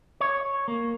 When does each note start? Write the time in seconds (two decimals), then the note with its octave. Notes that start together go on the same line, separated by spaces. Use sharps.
0.21 C#5
0.68 A#3